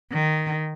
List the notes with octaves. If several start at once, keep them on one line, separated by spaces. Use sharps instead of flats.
D#3